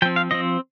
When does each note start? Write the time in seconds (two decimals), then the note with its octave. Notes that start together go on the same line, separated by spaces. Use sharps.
0.02 F3 G5
0.05 C4
0.16 F5
0.31 F3 C4 D#5